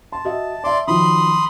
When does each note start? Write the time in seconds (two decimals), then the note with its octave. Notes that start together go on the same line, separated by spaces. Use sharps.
0.12 A5 C6
0.25 F#4 D#5 E5
0.64 D5 E5 A5 C6 D6
0.87 D#3 F3 F#3 B5 C6 D#6